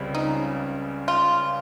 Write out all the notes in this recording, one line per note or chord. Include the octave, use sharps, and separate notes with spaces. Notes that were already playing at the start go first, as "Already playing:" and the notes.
Already playing: C#2 C#3 G3 C4
D#4
F4